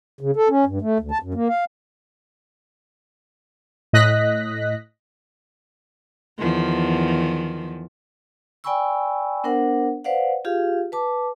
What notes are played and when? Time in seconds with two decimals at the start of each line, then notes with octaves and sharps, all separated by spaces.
0.21 C#3
0.36 A4
0.49 C#4
0.66 G2
0.81 A3
0.99 D2
1.11 A5
1.23 F#2
1.34 A#3
1.48 F5
3.93 A2 D#5 F#6 A#6 B6
6.39 E2 D#3 F3
8.64 D5 G5 G#5 B5 C#6 E6
9.44 B3 D4 A#4 C5 F#5
10.04 B4 C5 D5 F5 F#5
10.45 F4 G4 G#4 F5
10.92 B4 A5 D6